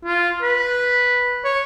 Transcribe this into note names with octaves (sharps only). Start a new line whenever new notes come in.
F4
B4
C#5